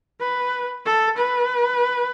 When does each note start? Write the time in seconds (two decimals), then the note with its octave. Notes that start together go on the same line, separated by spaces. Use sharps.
0.20 B4
0.86 A4
1.18 B4